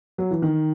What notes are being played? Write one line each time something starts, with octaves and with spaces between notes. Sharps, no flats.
F#3
E3
D#3